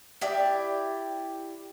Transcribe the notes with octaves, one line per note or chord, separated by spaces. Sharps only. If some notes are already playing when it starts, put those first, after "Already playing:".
E4 G4 D5